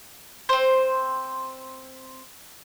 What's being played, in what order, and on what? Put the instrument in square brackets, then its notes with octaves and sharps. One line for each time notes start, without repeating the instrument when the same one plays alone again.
[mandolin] C4 C5